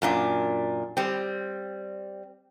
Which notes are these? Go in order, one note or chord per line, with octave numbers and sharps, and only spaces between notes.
F#2 A#2 D4
G3 C4